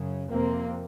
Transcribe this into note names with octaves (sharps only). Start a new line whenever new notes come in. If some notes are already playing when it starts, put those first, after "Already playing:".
Already playing: F#2 C#3
F2 C3 A#3 C4